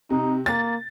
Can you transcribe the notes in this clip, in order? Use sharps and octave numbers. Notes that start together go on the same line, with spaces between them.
C3 D#4
A#3 A6